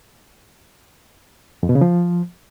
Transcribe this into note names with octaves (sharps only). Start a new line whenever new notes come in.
F2
B2
C#3
F3